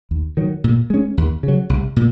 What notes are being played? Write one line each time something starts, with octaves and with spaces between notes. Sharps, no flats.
D#2
D#3 F#3
A#2
G#3 C#4
D#2
C#3 F#3
C2
A#2